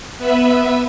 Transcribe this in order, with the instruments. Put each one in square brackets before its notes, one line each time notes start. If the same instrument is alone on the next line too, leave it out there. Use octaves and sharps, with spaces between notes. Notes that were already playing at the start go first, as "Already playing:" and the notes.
[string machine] B3 B4 E5 B5